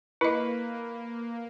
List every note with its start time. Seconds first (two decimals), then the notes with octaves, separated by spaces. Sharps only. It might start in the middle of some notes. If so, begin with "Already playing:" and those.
0.21 A#3 E4 B4 D#5